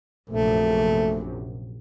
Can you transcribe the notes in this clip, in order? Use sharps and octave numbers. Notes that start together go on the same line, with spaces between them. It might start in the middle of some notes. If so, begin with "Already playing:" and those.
A#1 F#2 C3 A3